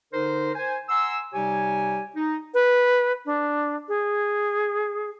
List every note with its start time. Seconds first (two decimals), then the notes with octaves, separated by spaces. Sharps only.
0.13 D3 D#4 A#4 C5
0.56 C5 G#5
0.89 F#5 G#5 A#5 C6 E6
1.34 C3 G3 D#4 G4 C#5 G#5
2.16 D#4
2.54 B4
3.26 D4
3.88 G#4